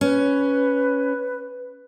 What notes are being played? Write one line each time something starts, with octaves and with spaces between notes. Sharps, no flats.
C#4 B4